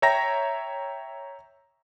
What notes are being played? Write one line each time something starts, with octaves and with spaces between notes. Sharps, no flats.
C#5 E5 G5 A#5 A#6